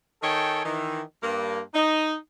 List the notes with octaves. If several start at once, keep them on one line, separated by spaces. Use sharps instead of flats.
D#3 A4 C#5 G5 G#5
D#3 E3
G2 A#3
D#4